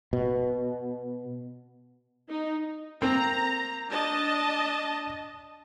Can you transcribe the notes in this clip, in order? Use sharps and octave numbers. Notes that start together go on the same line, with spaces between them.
B2
D#4
A#3 C4 A#5
D4 D#5 A5